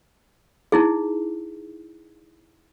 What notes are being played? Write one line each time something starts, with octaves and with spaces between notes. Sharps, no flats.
D#4 E4 G#4